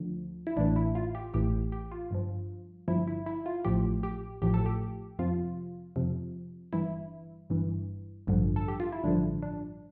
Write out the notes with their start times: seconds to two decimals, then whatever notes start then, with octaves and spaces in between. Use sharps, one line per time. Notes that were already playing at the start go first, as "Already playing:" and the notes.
Already playing: D2 D3 F3
0.47 E4
0.56 A1 A2 E3 D4
0.76 E4
0.95 F4
1.15 G4
1.34 A1 A2 E3 G4
1.72 G4
1.92 F4
2.11 G1 G2 F3
2.88 G1 G2 F3 E4
3.08 E4
3.26 E4
3.46 F4
3.65 A1 A2 F3 G4
4.03 G4
4.42 A1 A2 F3 G4
4.54 A4
4.66 G4
5.19 F2 C3 F3 F4
5.96 F2 C3 F3
6.73 G1 G2 E3 E4
7.50 G1 G2 E3
8.27 A1 G2 D3 F3
8.56 A4
8.68 G4
8.80 F4
8.92 E4
9.04 A1 G2 D3 F3 D4
9.43 D4